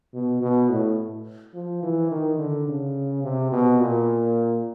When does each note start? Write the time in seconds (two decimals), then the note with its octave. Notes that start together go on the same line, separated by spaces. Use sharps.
0.14 B2
0.42 B2
0.69 A2
1.54 F3
1.83 E3
2.11 D#3
2.38 D3
2.68 C#3
3.23 C3
3.52 B2
3.80 A#2